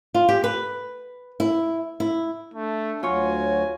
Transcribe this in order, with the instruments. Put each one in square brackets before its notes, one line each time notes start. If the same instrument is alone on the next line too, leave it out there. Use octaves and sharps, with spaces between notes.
[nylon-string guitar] F4
G4
B4
E4
E4
[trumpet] A3 [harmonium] D4
[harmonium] D2 F#3 F#4 [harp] F4 C#5 [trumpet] G#5